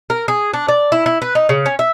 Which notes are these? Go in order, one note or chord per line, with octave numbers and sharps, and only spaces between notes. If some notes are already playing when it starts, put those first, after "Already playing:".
A#4
G#4
D4
D5
E4
E4
B4
D#4
C#3
C#4
E5